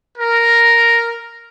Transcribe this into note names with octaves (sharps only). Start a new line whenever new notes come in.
A#4